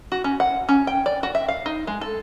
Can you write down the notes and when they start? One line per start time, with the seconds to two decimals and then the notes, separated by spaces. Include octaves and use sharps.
0.12 F#4
0.24 C#4
0.40 F#5
0.69 C#4
0.87 G5
1.06 D5
1.23 F#4
1.35 E5
1.48 F5
1.66 D#4
1.87 G#3
2.01 A4